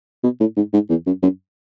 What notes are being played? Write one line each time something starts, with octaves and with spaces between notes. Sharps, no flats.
B2
A2
G#2
G#2
E2
F#2
F#2